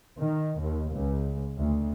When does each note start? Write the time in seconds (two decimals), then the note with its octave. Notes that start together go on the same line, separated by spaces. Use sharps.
0.20 D#3
0.61 D#2
0.92 C#2
1.57 D2